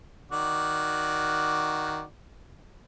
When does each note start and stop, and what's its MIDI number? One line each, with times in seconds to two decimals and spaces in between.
0.32 2.03 51
0.32 2.03 66
0.32 2.03 74